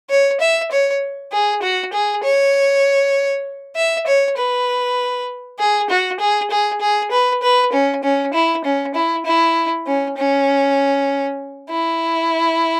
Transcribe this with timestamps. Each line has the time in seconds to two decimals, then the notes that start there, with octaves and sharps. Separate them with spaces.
0.10 C#5
0.41 E5
0.72 C#5
1.32 G#4
1.63 F#4
1.93 G#4
2.23 C#5
3.76 E5
4.07 C#5
4.37 B4
5.59 G#4
5.90 F#4
6.20 G#4
6.51 G#4
6.81 G#4
7.11 B4
7.42 B4
7.73 C#4
8.04 C#4
8.34 E4
8.64 C#4
8.95 E4
9.26 E4
9.87 C#4
10.17 C#4
11.70 E4